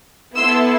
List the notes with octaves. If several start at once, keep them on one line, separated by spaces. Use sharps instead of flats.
B3 E4 A4 C6 E6